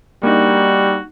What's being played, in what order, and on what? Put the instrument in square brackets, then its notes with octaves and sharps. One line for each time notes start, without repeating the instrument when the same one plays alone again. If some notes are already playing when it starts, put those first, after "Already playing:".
[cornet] G3 [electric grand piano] A#3 D4 D#4 [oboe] F#4